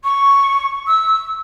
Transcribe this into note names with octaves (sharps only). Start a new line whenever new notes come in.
C#6
E6